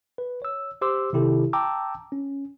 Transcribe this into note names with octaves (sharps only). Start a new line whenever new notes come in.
B4
C#5 E6
G4 C5 C6 D6 E6
C3 D#3 E4 G4 A4
G5 A5 A#5 D6 E6
C#4